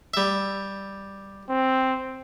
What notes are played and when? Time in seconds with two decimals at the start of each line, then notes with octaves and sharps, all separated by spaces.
0.14 G3 E5
1.50 C4